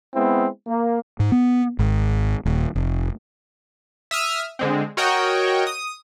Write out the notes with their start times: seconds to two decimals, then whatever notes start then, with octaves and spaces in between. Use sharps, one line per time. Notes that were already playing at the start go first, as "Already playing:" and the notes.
0.14 G#3 B3 C4 E4
0.67 A#3
1.20 G#2
1.32 B3
1.79 G#1
2.45 D#1
2.75 F1
4.11 E5 D#6 F6
4.59 D3 G#3 C4
4.97 F#4 A#4 C#5 D#5 G5
5.67 D#6